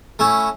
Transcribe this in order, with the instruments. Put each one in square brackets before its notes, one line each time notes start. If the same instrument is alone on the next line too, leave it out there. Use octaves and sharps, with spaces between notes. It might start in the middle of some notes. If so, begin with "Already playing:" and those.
[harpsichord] A3 C#4 E4